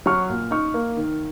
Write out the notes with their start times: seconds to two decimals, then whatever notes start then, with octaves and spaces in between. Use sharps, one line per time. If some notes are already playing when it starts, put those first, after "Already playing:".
0.06 F#3 C#6 F6
0.29 A#2
0.51 D#4 C#6 F6
0.74 A#3
0.97 D#3